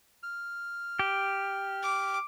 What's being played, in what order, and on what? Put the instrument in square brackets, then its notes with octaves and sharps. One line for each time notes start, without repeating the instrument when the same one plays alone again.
[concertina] F6
[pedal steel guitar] G4
[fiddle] D6